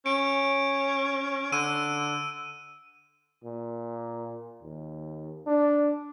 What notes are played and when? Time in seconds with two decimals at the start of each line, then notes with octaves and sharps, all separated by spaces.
0.06 C#4 D7
1.52 D3 E6 D#7
3.44 A#2
4.62 D#2
5.47 D4